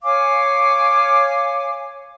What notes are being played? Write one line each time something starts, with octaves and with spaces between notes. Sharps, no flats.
C#5 F5 G#5 D6